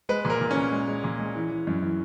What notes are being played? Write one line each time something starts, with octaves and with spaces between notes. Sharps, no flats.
G#3 B4
A#2 A#4
A#2
C#4
A#2
G#3
G#3
A#2
G#3
E3
E3
F#2
E3